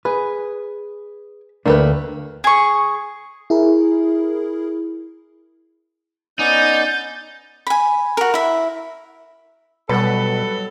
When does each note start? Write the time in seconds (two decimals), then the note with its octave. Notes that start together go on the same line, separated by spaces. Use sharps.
0.05 G#4 B4
1.66 D2 A3 A#3 D4 G4 B4
2.44 G#4 C#6
3.50 E4 G#4 A#4
6.39 B3 C#4 D#4 D5 G6 A6
7.67 G#5 B5
8.17 F#4 A#4
8.34 E4 E5
9.89 B2 F#3 G3 A4 B4 F#5 B6